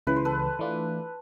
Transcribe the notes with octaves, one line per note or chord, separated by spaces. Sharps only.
C#2 C#3 E3 B4
C5
A4 B4
E3 A3 D4 F4